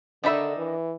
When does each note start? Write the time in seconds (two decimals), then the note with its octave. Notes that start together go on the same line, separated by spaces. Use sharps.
0.24 D3 D#3 D4 D#4 E5 B5
0.57 E3